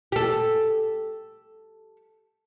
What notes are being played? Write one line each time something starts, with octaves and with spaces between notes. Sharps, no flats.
G4 A4